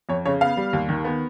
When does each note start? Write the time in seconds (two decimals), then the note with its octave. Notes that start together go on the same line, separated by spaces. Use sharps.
0.09 F2 C#5
0.26 C#3 C#5
0.41 B3 F5
0.57 G3
0.73 D#2
0.89 D#3
1.05 B3